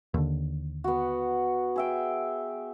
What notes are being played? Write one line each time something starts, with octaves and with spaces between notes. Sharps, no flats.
D#2 D3
B3 F#4
G#4 E5 G5